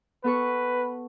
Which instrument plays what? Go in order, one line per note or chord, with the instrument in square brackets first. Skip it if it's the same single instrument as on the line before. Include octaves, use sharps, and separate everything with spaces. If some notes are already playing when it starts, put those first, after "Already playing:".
[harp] B3 A4 C#6 [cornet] B4